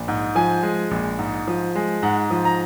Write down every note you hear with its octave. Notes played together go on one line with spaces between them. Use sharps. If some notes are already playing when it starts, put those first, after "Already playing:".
Already playing: A#1
G#2
F3 G#5
G#3
A#1
G#2
F3
G#3
G#2 F#5
F3
A#5